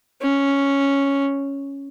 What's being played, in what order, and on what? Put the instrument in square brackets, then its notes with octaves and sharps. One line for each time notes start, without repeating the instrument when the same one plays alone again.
[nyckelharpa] C#4